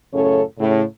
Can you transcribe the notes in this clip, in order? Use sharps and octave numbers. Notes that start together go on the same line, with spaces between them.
F#2 A2 C#3 C#4 A4 C#5
A2 C#3